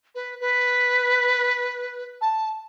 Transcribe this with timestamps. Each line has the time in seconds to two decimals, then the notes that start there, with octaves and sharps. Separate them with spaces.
0.15 B4
0.40 B4
2.21 A5